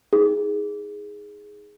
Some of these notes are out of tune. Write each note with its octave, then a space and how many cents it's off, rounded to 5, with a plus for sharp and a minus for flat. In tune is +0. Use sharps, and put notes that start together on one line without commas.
D#4 +30 G#4 +0